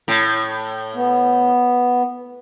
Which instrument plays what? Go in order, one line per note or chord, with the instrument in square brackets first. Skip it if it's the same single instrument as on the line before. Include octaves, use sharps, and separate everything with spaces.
[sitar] A2
[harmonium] B3